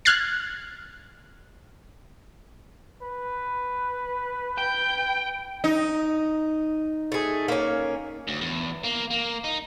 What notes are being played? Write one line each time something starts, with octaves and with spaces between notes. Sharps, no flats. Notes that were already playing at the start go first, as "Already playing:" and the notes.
F6 F#6 G#6 A6 C7
B4
G5 G6
D#4
A3 G#4
A#3 C#4
D2
E2
A#3
A#3
D#4